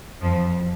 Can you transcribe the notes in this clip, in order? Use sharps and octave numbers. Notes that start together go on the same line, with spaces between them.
F2 F3